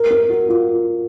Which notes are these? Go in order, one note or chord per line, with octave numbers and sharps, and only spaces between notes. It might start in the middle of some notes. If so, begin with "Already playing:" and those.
Already playing: A#4
A#4
F#4
F4